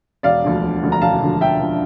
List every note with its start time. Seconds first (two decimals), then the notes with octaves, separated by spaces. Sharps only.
0.23 E1 D5 F5
0.44 D2 D3 F3
0.63 E1
0.83 D2 D3 F3
0.92 A#5
1.01 E1 F5 A5
1.22 D2 D3 F3
1.41 E1 E5 G5
1.60 D3 F3